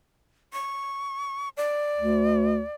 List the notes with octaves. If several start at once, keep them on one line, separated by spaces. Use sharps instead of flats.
C#6
D5
D2